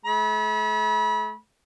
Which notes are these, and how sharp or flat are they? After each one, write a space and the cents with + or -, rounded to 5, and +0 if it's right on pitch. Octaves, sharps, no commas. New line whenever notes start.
A3 -45 B5 -30